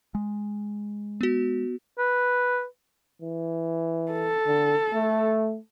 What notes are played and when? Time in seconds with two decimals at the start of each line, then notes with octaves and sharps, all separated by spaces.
0.15 G#3
1.21 B3 F#4
1.98 B4
3.22 E3
4.12 A4
4.47 D3
4.93 A3